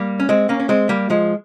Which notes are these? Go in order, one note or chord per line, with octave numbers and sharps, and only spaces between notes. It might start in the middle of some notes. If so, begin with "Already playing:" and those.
Already playing: G3 A#3
C#4
G#3 C4
A#3 C#4
C#4
G#3 C4
G3 A#3
F3 G#3